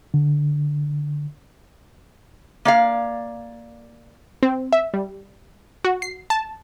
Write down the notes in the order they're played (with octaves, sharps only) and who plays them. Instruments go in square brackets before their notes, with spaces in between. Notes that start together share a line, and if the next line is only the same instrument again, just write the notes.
[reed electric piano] D3
[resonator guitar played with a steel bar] A#3 D5 F5
[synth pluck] C4
E5
G3
F#4
C7
A5